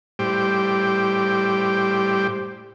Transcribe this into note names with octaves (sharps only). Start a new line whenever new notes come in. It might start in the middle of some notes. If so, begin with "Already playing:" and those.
A2 G3 G4 C5 G5